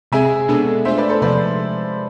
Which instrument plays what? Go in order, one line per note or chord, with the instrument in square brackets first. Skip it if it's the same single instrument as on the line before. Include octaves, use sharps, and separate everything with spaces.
[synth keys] C3 G#3 C4 G#4 [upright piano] E5 G#5
[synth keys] B2 G#3 B3 D4 A4
[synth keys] A3 D4 F4 [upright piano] C5 E5
[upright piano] B4 D5
A4 C5
[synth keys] C3 F3 G#3 [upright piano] B4 D5